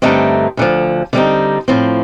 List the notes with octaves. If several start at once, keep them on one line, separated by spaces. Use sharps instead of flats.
G2 D3 A3 C4 D#4
D2 D3 F3
D3 G3 C4 D#4
A2 F3 C4